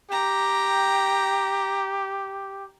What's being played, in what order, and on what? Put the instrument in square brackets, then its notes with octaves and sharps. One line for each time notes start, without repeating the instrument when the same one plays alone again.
[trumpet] G4 [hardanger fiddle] G5 A#5